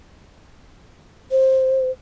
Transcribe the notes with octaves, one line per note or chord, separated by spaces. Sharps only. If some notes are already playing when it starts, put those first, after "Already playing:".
C5